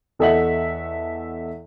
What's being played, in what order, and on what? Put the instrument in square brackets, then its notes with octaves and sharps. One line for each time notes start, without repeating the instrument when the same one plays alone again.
[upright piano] E2 A4 D#5 E5 F#5 F#7